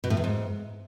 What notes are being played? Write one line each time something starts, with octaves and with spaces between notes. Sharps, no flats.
B2
A2
E2
G#2